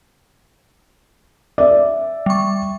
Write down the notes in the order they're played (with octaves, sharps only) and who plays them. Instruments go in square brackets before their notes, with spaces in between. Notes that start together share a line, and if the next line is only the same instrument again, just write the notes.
[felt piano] D5 E5
[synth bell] G3 C#6